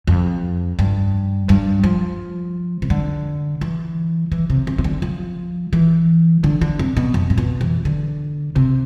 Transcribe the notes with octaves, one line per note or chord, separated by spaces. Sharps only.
F2
G2
G2
F3
C3
D3
E3
E3
C3
C3
C3
D3
F3
E3
D3
D3
C3
B2
F2
A2
B2
E3
D3
C3